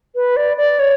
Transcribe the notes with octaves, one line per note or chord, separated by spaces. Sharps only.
B4
D5
D5
C#5